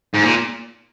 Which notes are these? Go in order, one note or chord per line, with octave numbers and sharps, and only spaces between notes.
G#2
A#2